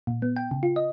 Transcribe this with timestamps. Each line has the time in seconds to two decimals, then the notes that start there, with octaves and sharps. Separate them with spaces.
0.07 A#2
0.22 B3
0.36 G5
0.51 C#3
0.63 F4
0.76 D#5